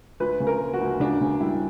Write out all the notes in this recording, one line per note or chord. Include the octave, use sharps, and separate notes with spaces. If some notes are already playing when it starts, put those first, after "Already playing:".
D2 B4
C#3
A#4
A#3
F#4
D2
C#3 D4
C#3
G3 E4